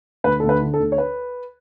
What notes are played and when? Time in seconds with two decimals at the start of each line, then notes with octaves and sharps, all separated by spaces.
0.24 D2 B4
0.40 D2 A4
0.49 B4
0.62 D3
0.74 A4
0.80 D2
0.92 C#5
0.98 B4